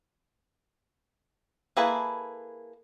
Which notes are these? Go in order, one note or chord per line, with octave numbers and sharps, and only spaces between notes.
A#3 E4 G#4 A4 B4